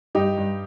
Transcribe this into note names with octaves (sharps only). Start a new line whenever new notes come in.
G2 D#4 G4
G2